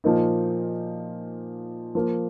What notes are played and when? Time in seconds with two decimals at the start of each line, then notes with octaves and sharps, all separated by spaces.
0.04 A#2 F3 A#3 D#4
1.95 F3 A#3 F4